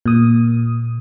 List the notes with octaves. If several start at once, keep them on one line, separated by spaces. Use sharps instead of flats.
A#2 D#6